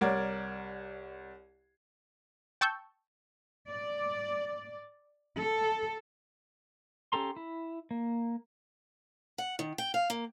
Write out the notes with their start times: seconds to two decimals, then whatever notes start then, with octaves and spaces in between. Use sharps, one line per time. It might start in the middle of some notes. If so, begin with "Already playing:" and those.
0.01 C2 A#4 C#5 D5 F#5 G#6
2.61 G5 A5 C#6 E6 G6
3.71 D5
5.40 A4
7.12 C#4 G4 A4 A#5 C6
7.36 E4
7.91 A#3
9.38 F#5
9.59 D#3
9.78 G5
9.94 F5
10.10 A#3